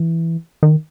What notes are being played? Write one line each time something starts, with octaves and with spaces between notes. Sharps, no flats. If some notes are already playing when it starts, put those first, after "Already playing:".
Already playing: E3
D#3